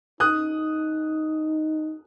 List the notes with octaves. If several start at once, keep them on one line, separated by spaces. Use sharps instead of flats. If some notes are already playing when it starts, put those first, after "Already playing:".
D#4 D#6 F#6